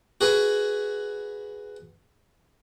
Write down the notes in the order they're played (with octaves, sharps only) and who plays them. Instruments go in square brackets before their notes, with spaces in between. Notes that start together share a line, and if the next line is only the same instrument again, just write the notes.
[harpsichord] F#4 G#4 B4